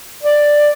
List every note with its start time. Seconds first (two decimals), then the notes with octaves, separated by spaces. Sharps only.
0.23 D5